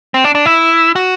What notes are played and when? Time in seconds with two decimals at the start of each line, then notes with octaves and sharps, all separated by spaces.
0.14 C4
0.24 D4
0.35 D4
0.46 E4
0.96 F#4